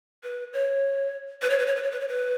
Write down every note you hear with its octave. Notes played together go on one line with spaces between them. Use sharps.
B4
C#5
B4
C#5
B4
C#5
B4
C#5
B4
C#5
B4